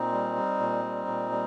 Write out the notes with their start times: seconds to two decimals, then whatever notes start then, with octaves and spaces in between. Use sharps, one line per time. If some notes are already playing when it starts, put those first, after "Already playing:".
Already playing: A#2 C4 D#4
0.12 G3
0.36 G3
0.59 A#2
0.84 G3
1.07 A#2
1.31 G3